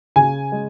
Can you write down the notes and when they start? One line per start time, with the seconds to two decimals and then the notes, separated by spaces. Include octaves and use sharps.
0.16 C#3 G#5
0.52 G#3